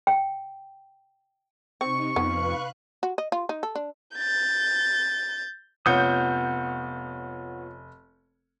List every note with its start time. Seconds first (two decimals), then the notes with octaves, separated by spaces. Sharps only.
0.07 G5
1.81 C3 C4 D#4 C#6
2.16 F2 B3 B4 F5 F#6
3.03 F#4
3.18 D#5
3.32 F4
3.49 D#4
3.63 A4
3.75 D4
4.16 G6 A6
5.86 F1 B3 F4 C#5 F#5 D#6 G6